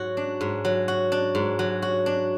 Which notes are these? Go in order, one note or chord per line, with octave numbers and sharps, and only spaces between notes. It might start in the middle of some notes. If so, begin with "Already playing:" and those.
Already playing: G#2 F#3 F#4
D4
G#2
F#3
F#4
D4
G#2
F#3
F#4
D4